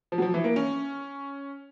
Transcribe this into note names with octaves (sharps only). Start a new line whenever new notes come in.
F3
F#3
F3
E3
A#3
C#4